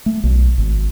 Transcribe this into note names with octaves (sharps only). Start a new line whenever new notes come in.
A3
B1
G#1